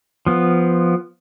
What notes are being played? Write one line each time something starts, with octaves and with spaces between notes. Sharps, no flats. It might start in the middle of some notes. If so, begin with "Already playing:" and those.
F3 B3